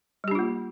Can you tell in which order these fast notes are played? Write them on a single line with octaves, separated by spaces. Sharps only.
G3 G4 D4 F4 A#3